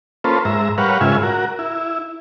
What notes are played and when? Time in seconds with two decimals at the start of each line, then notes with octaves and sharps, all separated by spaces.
0.24 A#3 C#4 F4 A4 B4 C5
0.45 G#2 E5 A#5
0.78 G3 A#4 B4 C#5 F5 F#5
1.01 G#2 C#3 F4 E5 G#5
1.23 F#4 A#4
1.59 E4